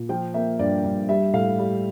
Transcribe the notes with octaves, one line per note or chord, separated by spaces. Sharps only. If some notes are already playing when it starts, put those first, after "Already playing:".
Already playing: A#2
F3 G5
A#3 E5
G2 D5
G2
G3 E5
A2 F5
G3